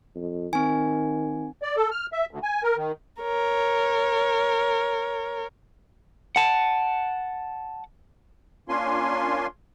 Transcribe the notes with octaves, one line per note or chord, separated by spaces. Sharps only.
F2
D#3 C4 G#5
D5
A4
F6
E5
D2
G#5
A#4
D#3
A#4 C#5
F#5 A5
A#3 C#4 D4 F4 G#5 C6